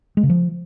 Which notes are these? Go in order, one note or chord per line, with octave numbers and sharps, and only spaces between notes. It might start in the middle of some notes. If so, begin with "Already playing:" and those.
G#3
C#3
F3